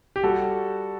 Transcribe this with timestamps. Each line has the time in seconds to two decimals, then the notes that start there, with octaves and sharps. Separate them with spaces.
0.16 G4
0.23 G3 F#4 A4